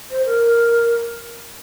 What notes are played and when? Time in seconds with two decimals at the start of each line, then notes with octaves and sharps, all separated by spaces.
0.11 C5
0.26 A#4